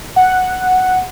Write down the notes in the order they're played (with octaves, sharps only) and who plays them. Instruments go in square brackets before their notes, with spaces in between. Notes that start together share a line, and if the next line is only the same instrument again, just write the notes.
[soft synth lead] F#5